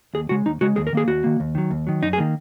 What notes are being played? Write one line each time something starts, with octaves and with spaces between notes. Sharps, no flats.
D#2 G#4
C#3 G#3 F#4
D#2 D#4
C#3 G#3 F#4
D#2 G#4
A#4
D#3 A#3 G#4
D#2 F#4
D#3 A#3
D#2
D#3 F#3
D#2
D#3 F#3
F#2 D#4
G#4
D#3 A#3